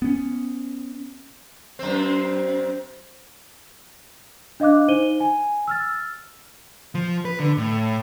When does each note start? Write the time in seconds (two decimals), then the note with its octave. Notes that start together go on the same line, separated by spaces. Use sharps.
0.02 B3 C#4
1.79 F#2 C4
4.60 D4 D#5 F5 D6 F#6
4.88 D#4 C5 D#7 G7
5.20 G#5
5.68 E6 F6 A6
6.95 F3
7.25 B4
7.40 D3
7.58 A2